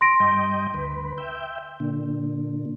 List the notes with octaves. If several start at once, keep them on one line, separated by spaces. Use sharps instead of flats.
C6 A#6 D7
G2 D#5 G5
D2 B4
E5 G5
A#2 D3